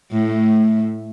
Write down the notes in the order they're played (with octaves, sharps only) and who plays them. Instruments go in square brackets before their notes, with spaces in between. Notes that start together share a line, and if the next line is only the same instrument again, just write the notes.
[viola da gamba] A2 A3